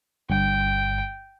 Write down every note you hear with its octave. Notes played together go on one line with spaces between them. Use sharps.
G1 G2 G5